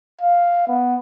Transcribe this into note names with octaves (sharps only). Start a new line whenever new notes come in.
F5
B3